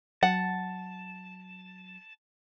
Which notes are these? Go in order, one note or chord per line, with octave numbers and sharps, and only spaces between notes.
F#3 F#5 A5